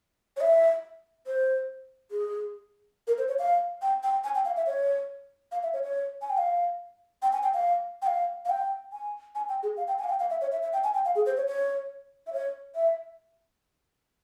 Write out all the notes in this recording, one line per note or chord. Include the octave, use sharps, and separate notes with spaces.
C#5
E5
C5
G#4
A#4
C5
C#5
F5
G5
G5
G#5
G5
F5
E5
C#5
F5
E5
C#5
C#5
G#5
G5
F5
G5
G#5
G5
F5
G5
F5
F5
G5
G#5
G#5
G5
G#4
F5
G5
G#5
F5
G5
F5
E5
C#5
E5
E5
G5
G#5
G5
F5
G#4
C5
C#5
C#5
E5
C#5
E5